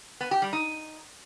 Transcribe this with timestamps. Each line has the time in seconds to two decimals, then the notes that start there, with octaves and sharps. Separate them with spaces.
0.21 B3
0.31 G4
0.42 G3
0.53 D#4